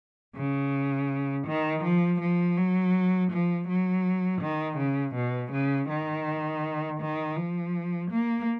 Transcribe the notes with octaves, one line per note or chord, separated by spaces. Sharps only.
C#3
D#3
F3
F3
F#3
F3
F#3
D#3
C#3
B2
C#3
D#3
D#3
F3
A#3